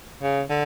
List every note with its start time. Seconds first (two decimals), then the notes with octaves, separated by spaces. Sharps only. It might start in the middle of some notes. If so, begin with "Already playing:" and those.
0.23 C#3
0.50 D3